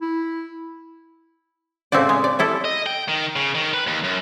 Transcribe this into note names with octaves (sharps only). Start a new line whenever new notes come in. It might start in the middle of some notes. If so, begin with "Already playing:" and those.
E4
A2 C#3 C4 E4 F#4 D5
G#3
D5
G3 E4 A4
D#5
G5
D#3
C#3
D#3
B4
D#2
F#2